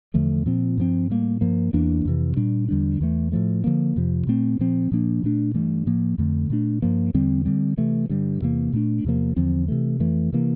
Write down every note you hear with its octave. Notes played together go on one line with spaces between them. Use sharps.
E2 D3 F3 A3
A#2 F3 C4
G2 F3 C4
A2 G3 A#3
G2 F3 A#3
E2 E3 A#3 D4
F2 C3 E3
A#2 G3 D4
E2 D3 G3 D4
E2 E3 A3
A2 F3 A3
D3 F3 A#3
F2 C3 F3
A#2 A3 C4
A#2 F3 C4
A#2 F3 A#3 D4
A#2 A3 D4
G2 E3 A3
A2 F3 A#3
F2 D3 A3
A#2 A3 D4
G2 F3 A#3
E2 D3 G3 C4
D3 G3 C4
C3 E3 A3
G2 D3 G3
E2 C3 E3 A#3
A#2 A3 D4
E2 C3 F3 A#3
E2 D3 F3 C4
C3 E3 A3
F2 E3 A3
C3 E3 A#3